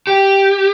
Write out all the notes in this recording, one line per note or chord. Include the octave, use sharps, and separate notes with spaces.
G4